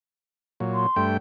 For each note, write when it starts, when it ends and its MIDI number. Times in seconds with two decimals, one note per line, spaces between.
0.60 0.87 46
0.60 0.87 54
0.75 1.02 84
0.96 1.17 43
0.96 1.17 57
0.96 1.17 79